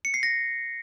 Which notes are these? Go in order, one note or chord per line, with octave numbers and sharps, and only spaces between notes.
C#7
C7
A#6